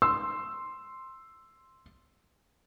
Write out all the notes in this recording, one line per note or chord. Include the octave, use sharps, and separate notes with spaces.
C6 E6